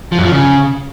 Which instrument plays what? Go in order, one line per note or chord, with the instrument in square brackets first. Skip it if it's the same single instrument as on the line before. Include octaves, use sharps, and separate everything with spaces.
[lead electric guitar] F3
F#2
F3
C#3